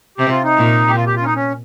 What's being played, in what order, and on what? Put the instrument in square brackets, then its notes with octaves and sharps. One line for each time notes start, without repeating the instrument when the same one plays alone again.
[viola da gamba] C3 [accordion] G4
[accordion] F4
D#4
[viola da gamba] A#2
[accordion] G4
F4
G4
F4
C#4
D#4
C#4